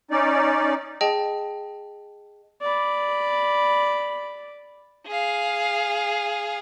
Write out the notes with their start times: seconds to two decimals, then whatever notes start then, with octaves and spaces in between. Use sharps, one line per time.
0.11 C#4 D#4 D5
1.01 G#4 D#5 G5 A5
2.62 D5 B5
5.07 G#4 F5